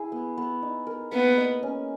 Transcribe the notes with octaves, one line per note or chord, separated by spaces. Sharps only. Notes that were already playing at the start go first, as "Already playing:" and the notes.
Already playing: E4 G#4
B3
B3
D#4
A#4
A#3 B3
D#5
C#4